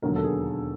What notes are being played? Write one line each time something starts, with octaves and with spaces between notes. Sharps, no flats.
E1 D#2 D3 F#3 A#4
A4
G#4